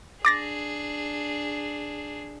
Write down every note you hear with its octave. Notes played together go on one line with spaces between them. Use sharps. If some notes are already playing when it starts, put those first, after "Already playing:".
D4 G#4 D6 A6 A#6